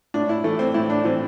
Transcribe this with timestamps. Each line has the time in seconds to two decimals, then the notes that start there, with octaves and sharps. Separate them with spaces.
0.14 A2 D4
0.29 E4
0.44 E3 A3
0.59 C4
0.74 A2 E4
0.90 D4
1.05 E3 C4